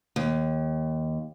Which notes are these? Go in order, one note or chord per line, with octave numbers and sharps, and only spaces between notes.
D#2